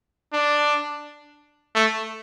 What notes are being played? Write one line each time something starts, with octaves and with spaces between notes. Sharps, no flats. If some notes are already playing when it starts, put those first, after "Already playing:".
D4
A3